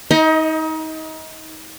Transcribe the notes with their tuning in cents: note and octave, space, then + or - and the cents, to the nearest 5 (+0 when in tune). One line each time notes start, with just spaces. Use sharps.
D#4 +30 D#5 +0